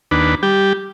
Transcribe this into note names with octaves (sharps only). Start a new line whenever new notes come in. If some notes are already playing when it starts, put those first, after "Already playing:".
D#2 D4 B4
G3 G4